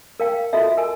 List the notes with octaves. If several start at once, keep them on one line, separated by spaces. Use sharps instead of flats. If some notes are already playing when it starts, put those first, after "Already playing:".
A#4 F5 G5
F4 F#4 A4 D#5 E5
A#4 G#5